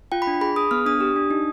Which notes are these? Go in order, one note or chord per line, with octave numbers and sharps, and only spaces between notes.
F4 G5
B5
D4
G#4 B5
G#4 D#6
B3 F6
D4 D#6
G4
D4
D#4